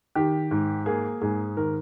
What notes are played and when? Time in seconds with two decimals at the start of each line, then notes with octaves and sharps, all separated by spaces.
0.15 D#3 G4
0.51 G#2
0.86 A#3 G#4
1.21 G#2 G#4
1.57 D#3 A#4